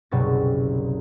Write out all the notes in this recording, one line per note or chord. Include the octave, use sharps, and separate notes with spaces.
F#1 C2 B2 C#6 A6